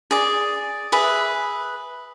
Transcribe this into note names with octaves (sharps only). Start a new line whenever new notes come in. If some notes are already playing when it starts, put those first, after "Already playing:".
G#4 D5
G#4 B4 E5